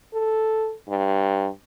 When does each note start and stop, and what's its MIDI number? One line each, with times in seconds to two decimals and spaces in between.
0.13 0.72 69
0.88 1.47 43